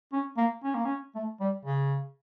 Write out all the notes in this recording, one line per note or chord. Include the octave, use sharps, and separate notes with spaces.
C#4
A#3
C#4
A#3
C#4
A3
G3
C#3